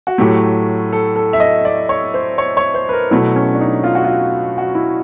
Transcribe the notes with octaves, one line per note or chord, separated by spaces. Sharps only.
F#4
A2 F#3 A3 G4
A4
A4
E5
D#5
D5
C#5
C5
C#5
C#5
C5
B4
A#4
B2 F#3 A3 E4
C#4
D4
D#4
F4
F#4
F4
F#4
E4